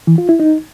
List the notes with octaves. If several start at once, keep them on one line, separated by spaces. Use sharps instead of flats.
E3
F4
E4
D#4